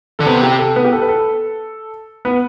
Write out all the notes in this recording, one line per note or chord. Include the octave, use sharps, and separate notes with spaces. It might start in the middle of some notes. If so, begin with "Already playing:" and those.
D3 A4
C3 B3 B4
G4
A4
B3 B4
G4
A4
B4
A4
B3 B4